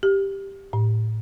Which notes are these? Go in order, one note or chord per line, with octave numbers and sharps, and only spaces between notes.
G4
A2